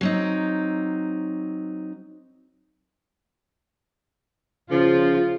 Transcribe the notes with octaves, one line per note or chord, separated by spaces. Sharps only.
F#3 C4 D#4
C#3 F3 F4